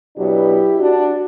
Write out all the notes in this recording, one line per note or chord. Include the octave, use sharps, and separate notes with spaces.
B2 F#3 B3 D4 E4 G4
D4 F#4